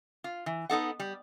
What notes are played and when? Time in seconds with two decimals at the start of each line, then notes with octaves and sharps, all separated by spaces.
0.24 F4
0.46 E3
0.70 B3 D#4 A4 F#5
1.00 G3